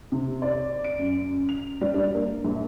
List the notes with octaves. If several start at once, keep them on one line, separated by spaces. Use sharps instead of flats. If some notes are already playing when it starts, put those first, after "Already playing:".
C3
D5
D7
F#2
F7
G3
D4
A#3
A#1